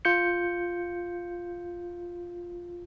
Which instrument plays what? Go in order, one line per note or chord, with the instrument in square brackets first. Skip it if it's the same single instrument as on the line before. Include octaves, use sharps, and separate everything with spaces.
[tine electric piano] F4 G6 C#7